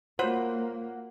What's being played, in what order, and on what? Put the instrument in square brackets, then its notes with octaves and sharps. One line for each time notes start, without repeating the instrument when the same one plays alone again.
[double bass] A#3 [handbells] F4 F#4 C#5 [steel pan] C5 [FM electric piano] F#5